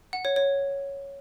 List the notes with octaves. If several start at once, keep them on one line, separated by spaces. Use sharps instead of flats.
F#5
C#5
C#5